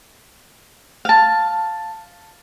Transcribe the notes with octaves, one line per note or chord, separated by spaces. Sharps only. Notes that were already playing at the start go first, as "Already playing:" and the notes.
F5 A5